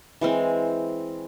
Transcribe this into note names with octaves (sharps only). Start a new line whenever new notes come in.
E3 G#3 C4